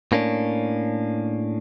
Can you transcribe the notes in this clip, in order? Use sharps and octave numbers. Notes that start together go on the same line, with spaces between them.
A2 A#3 C#4 D4